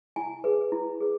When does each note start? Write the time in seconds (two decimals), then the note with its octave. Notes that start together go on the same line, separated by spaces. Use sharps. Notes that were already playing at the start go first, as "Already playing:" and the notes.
0.16 E4 G#5
0.44 G#4 B4
0.72 E4
1.00 G#4 B4